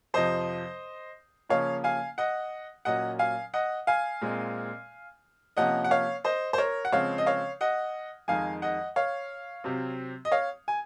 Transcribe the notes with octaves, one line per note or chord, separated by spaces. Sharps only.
F2 C3 F3 C5 D#5
C#3 F3 A#3 C#4 C#5 F5
F5 G#5
D#5 F#5
A#2 F#3 C#4 D#5 F#5
F5 G#5
D#5 F#5
F5 G#5
A#2 G#3 C4
C3 F3 A#3 C#4 D#5 F#5
F#5
C#5 F5
C5 D#5
C5
A#4 C#5
F#5
C#3 F3 G#3 C4 C#5 F5
D#5
C#5 F5
D#5 F#5
F2 D#3 G#3 F5 G#5
D#5 F#5
C#5 F5
C3 F#3 C4
D#5
C#5 F5
G#5